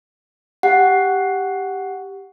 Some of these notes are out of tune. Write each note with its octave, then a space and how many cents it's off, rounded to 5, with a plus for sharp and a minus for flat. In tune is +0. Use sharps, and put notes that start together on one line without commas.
G4 +0 F#5 +0